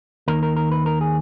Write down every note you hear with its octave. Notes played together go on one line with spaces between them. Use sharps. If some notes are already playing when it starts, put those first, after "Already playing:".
D#2 D#3 A#3 A#4
A#4
A#4
B4
A#4
G#4